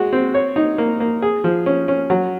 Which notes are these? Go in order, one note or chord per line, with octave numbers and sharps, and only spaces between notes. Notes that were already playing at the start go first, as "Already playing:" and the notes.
Already playing: G#3 F#4
C4
C#5
D#4
A#3
A#3
G#4
F3
C#4
C#4
F#3